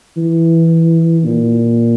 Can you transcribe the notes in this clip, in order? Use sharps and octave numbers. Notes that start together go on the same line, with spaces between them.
E3
A#2